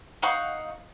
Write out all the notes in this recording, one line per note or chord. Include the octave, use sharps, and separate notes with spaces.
D#4 F5 F#5 C#6